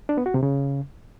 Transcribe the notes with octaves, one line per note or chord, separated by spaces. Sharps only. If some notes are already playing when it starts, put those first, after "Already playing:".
D4
B3
F#4
C3
C#3